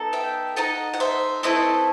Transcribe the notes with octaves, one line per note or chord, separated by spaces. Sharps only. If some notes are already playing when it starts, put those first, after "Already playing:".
Already playing: B3 D#4 A4
E5 G5
D#4 A4 D#5 F#5
F#5
C5 E5
A3 C4 E4 A4 B4 D#5